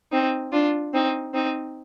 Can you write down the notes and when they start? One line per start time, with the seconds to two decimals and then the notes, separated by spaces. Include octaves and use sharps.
0.11 C4 D#4
0.52 D4 F4
0.93 C4 D#4
1.33 C4 D#4